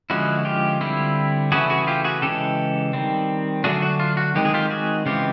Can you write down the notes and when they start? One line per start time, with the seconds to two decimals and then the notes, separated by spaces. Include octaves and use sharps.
0.10 D3 F3 G#3 C#4 E4 F#4
0.45 F4 G4
0.81 D3 G3 C4 E4
1.52 C#3 E3 A3 C#4 E4 F#4 G#4
1.70 F#4 G#4
1.87 F4 G4
2.04 F#4 G#4
2.22 C#3 E3 G#3 G4 A4
2.93 D#3 G3 C4
3.64 D3 F#3 A3 D4 F#4 G#4
3.82 F#4
4.00 F4
4.17 F#4
4.35 D#3 G#3 C4 G4
4.45 G#4
4.54 F4 G4
4.70 F#4 G#4
5.06 C#3 E3 G#3 C4 F4 G4